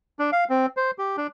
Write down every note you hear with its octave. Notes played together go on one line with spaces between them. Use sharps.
D4
F5
C4
C5
G4
D4